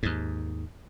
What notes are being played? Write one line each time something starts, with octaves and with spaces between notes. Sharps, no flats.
D#2 G#2